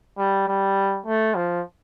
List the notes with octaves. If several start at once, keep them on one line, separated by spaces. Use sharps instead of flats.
G3
G3
A3
F3